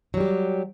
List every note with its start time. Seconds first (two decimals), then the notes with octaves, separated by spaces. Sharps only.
0.14 F#3
0.17 G3
0.20 G4